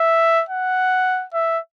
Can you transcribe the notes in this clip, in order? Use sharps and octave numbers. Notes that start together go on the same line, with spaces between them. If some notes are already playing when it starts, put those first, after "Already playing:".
Already playing: E5
F#5
E5